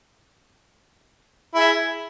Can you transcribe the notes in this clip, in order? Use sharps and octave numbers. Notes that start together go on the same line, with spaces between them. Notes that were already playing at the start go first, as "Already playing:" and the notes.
E4 G#4 E5